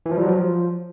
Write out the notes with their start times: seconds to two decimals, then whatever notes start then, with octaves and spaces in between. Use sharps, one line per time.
0.06 E3
0.11 F3
0.17 G3
0.23 F#3
0.28 F3